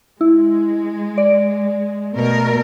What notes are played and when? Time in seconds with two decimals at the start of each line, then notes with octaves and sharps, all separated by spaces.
0.21 G#3 E4
1.18 D5
2.13 B2 A3 A#4